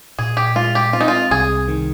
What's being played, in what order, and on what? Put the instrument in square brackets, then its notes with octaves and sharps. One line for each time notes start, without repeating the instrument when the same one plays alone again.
[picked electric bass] A#2 [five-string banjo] G#4
[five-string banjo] G4
[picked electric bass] G#3 [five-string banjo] F4
[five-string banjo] G4
[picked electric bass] C4 [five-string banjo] F4
[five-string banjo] D#4
F4
[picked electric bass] C2 [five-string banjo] G#4
[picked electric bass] D#3